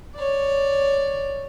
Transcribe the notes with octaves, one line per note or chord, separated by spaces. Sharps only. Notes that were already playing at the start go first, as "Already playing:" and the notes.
C#5 D5